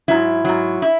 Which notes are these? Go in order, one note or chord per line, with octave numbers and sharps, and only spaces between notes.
G#2 F#3 E4
G#2 F#3
E4